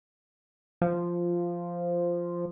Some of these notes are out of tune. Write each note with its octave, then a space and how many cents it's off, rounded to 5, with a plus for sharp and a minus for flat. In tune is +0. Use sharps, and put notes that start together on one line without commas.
F3 -5